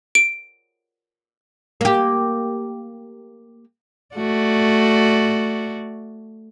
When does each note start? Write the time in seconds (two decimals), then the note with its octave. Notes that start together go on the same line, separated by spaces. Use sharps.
0.15 D7
1.81 A#3 G4
4.16 A3 F#4 D5